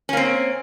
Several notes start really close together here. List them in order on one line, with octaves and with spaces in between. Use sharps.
C#4 A#3 C4